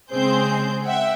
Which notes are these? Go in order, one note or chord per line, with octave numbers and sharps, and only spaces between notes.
C#3 G#3 C4 G#4 C5 G6
E5 F#5 G5